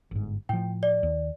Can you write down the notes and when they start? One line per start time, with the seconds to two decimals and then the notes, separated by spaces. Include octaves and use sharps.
0.11 G1 G#2
0.49 A2 F3 G5
0.83 D5
1.03 D#2